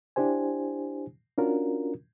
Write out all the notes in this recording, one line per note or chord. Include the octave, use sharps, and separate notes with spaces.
D4 E4 G4 C5 G#5
C#4 D4 F4 F#4 A#4